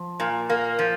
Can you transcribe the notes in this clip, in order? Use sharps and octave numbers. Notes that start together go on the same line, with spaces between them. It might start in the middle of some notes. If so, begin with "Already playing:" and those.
Already playing: F3
A#2
A#3
F3